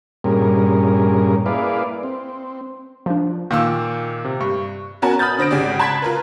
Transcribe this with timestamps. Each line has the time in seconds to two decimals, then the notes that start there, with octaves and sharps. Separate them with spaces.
0.24 G2 A#2 G3 C#4 G#4 A#4
1.46 A#3 E4 G#4 B4 D5 F5
2.03 C4
3.06 F3 D4
3.51 A#2 D#3 A#3 F4 E6
4.25 C3
4.41 G2 C#6
5.02 B3 C#4 F#4 A#4 G#5 A5
5.19 B5 D#6 F6 G6 A6
5.38 D3 C5 A#6 D7
5.51 G#1 C#3 G4 D5
5.79 A5 B5 C6 F#6 G#6 B6
6.02 F4 A#4 B4